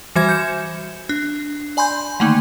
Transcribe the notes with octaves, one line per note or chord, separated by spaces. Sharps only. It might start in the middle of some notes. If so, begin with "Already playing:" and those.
E3 G3 F#4 C5 E5 G#6
G6 C#7 E7
D4
D5 G#5 B5 C6 G6
D3 D#3 A3 A#3 D#4